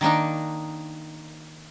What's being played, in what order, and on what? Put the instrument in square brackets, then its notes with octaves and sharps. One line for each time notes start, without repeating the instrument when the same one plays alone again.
[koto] D#3 A#3 D4 D#4